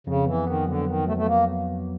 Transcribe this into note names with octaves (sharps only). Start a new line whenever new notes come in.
F2 C#3
E3 B3
D#3 B3
D3 F#3
D#3 B3
F#3 A3
A3
A#3 B3